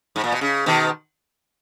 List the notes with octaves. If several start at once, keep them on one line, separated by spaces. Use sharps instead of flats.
G#2
A#2
B2
C#3
B2 D#3